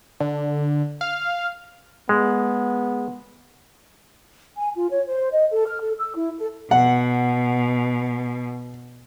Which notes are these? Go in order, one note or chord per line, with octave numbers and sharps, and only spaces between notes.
D3
F5
G#3 B3
G#5
F4
C#5
C5
D#5
A4
F6
A4
E6
E4
A4
B2 F#5